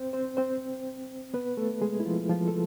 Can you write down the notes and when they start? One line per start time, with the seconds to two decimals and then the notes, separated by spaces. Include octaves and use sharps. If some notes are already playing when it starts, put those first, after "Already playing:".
Already playing: C4 C5
0.13 C4 C5
0.37 C4 C5
1.34 B3 B4
1.57 A3 A4
1.82 G#3 G#4
2.00 E4
2.05 F3 F4
2.30 F3 F4
2.48 A4